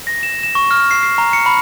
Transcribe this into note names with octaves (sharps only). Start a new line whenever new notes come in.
A#6
E7
E7
C#6
F6
C7
C7
A#5
C#7
B5